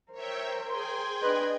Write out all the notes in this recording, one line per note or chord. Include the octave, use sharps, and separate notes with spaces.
A#4 C5 C#5 E5 G5
G#4 G5 G#5 C6
D4 B4 D#5